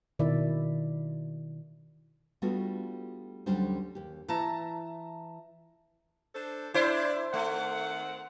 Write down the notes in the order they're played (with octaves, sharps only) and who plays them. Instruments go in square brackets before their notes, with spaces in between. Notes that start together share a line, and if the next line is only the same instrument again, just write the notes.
[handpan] B2 D#3 E4 D5 E5
[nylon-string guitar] G3 A3 B3 D4 F4 F#4
D2 F#3 G3 C#4 D4 C5
D#2 G4
[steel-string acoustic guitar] E3 E5 A5 A#5
[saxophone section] D4 A4 C5
[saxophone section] D4 D5 [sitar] E4 C5
[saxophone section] D#3 C4 F#5 [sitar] A3